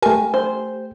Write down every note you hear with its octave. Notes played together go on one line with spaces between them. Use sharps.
A3 G4 A#4 G#5
C5